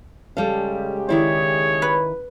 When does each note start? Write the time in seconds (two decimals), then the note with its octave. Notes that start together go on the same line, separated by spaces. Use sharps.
0.37 C#3 G3 G#3 G4 A4 F5
1.09 D#3 E4 G#4 C#5 D5
1.82 B4